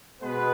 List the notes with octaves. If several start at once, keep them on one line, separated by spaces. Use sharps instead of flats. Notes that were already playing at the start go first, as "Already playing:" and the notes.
B2 G#3 B3 B4